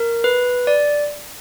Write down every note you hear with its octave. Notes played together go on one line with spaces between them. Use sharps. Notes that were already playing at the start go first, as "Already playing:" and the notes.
Already playing: A#4
B4
D5